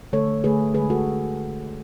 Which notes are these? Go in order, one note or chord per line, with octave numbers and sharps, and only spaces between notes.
D3 A3 A4 C#5
D3 A3 G#4 B4
D3 G#3 G#4 B4
F#4 A4